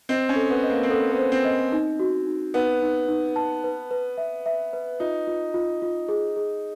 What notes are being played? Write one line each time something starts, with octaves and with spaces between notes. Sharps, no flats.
C4 D#5
C#4
A4
B3
D#5
A#3
C4
B3 A4
B3
C5
C4
D#5
D#4
F#4
D#4
B3 D#4
D#4
D#4
A5
B4
B4
E5
E5
B4
D#4 F4
F4
F4
F4
G#4
G#4